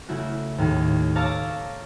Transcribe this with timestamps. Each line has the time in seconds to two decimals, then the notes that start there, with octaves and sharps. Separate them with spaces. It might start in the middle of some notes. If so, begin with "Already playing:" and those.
0.09 C#3 A3 E4 F#4
0.58 D#2 A2 G#4
1.15 C#5 F5 A5 A#5 D6 E6